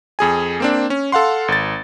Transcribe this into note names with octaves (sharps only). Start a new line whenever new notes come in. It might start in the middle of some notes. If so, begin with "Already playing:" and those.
F2 G#4 G#5
A#3 C4 D4
C#4
A4 F5 F#5 C6
G#1 A6